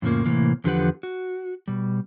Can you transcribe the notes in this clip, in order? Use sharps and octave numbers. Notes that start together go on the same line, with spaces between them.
F2 A2 C#3 F3 A#3
A2 C3 E3 A#3
E2 D3 F3 G4 B4 F#5
F#4
B2 G3